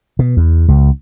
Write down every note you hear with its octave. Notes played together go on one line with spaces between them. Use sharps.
B2
E2
C#2